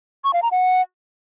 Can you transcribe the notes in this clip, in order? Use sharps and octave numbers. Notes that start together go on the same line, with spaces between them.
C#6
F5
A#5
F#5